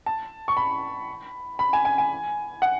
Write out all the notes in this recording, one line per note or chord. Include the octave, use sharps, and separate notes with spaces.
A5
C#6
B5
B5
G#5
G#5
G#5
F#5